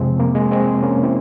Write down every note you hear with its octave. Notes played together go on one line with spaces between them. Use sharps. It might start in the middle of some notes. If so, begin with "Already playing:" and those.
Already playing: F2 C3 F3 G#3 C4
A#3
G#3
G#3 C4
A#3 C#4
C4 E4